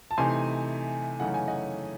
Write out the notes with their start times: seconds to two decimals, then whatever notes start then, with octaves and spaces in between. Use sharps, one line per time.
0.11 A5
0.18 C3 E3 A3 D#4 G#5 C6
1.20 F#2 C#3 E3 A3 D#4 F#5
1.34 G#5
1.48 D#5 F#5